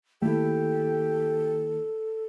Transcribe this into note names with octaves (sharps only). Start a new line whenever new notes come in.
D#3 A3 A#3 E4 G4 A4